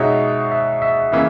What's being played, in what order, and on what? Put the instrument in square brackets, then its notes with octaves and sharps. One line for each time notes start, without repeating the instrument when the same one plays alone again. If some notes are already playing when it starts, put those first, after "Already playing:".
Already playing: [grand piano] B2 G#3 D#4 F#4 C#5 [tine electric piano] E5
[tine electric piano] E5
E5
[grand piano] C#3 E3 A#3 [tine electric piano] E5